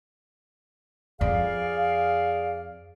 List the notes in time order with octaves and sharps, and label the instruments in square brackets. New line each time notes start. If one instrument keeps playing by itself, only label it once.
[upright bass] F2 [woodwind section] G#4 D5 F5